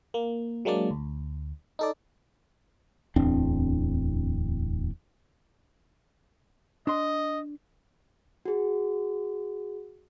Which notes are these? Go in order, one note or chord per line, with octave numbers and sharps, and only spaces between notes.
A#3
F#3 G#3 A#3 D4 D5
D2
D#4 A4 D5
D1 E2 C4 D4
D4 D#5 C6
F#4 G#4